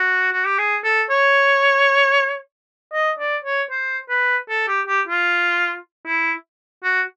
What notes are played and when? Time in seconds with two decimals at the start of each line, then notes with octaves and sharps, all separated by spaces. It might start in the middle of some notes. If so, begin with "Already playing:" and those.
Already playing: F#4
0.32 F#4
0.45 G4
0.58 G#4
0.84 A4
1.10 C#5
2.93 D#5
3.19 D5
3.44 C#5
3.71 C5
4.09 B4
4.49 A4
4.68 G4
4.87 G4
5.08 F4
6.05 E4
6.84 F#4